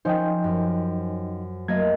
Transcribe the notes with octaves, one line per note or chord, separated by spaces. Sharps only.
F3 C#4 D#4 C5 D#5 G5
F#2
F#3 A3 A#3 D#5 G#6